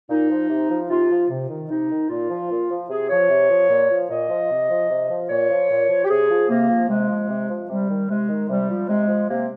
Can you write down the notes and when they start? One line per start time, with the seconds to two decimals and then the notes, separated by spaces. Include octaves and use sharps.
0.09 A#2 D#4
0.30 F3
0.49 C3
0.70 F3
0.89 C3 F4
1.10 F3
1.30 C3
1.49 D#3
1.69 C3 D#4
1.90 D#3
2.09 A#2 F4
2.30 F3
2.50 A#2
2.70 F3
2.89 C3 G#4
3.10 F3 C#5
3.29 C3
3.49 F3
3.69 A#2
3.90 F3
4.09 A#2 D#5
4.29 F3
4.50 C3
4.70 F3
4.89 C3
5.09 F3
5.29 A#2 C#5
5.50 F3
5.69 A#2
5.89 F3
6.04 G4
6.09 C3 G#4
6.30 F3
6.49 C3 A#3
6.69 F3
6.89 C3 G#3
7.09 F3
7.28 C3
7.49 F3
7.69 C3 G3
7.89 D#3
8.09 C3 G#3
8.29 D#3
8.49 C3 G3
8.69 F3
8.89 C3 G#3
9.08 F3
9.29 C3 A#3